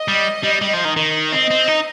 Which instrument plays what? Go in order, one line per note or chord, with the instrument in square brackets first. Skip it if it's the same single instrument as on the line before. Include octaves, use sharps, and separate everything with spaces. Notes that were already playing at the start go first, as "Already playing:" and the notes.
Already playing: [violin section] D#5
[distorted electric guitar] G3
G3
G3
F3
D#3
D#3
[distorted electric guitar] C4 [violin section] D#5
[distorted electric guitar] C4
D#4